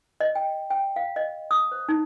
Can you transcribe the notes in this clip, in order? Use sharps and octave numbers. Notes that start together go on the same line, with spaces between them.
D#5
G5
G5
F5
D#5
D#6
C5
D#4